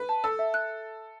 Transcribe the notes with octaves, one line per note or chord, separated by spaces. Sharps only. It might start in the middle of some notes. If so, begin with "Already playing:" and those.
Already playing: B4
A5
A4 E6
E5
F#6